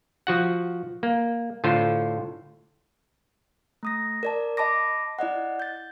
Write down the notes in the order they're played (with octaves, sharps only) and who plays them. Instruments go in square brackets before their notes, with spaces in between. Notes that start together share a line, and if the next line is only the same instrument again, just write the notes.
[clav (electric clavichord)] F3 F#4 F#5
A#3
A2 D3 F4 C5
[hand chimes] A3 D#6 A#6
A#4 D5 A5
D#5 A5 B5 D6 A#6
E4 D5 D#5 F#5
G6 A6